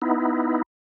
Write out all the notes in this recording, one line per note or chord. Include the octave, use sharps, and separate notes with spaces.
B3 D#4 E4